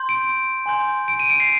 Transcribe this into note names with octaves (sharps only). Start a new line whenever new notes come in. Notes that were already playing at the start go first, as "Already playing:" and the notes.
Already playing: C6 G6
D7
G#5 C6 G6
D7
D#7
D7
C7